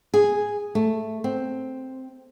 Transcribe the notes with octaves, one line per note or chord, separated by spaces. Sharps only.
G#4
A3
C4